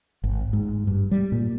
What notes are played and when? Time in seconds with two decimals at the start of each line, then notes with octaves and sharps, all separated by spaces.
0.24 G#1
0.53 G#2
0.87 G2
1.11 G3
1.32 A#2